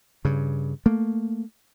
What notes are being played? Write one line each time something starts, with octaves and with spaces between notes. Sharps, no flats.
G2 C#3
A3 A#3